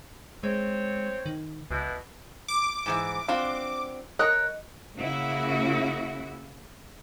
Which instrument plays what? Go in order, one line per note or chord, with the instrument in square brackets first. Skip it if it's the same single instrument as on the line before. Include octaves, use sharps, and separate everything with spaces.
[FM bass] G#3 [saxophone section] C4 C#5
[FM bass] D#3
[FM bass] C#2 [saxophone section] B2 E3
[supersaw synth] D6
[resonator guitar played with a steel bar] G#2 D#3 E3
[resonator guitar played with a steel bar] C4 D4 F#4 [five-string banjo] F4
[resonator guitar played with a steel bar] A#4 C#5 [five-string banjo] D#5 [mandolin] F#6
[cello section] C#3 A#3 E4 F#4